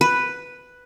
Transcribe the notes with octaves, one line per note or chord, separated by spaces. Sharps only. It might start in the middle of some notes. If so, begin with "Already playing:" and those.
B4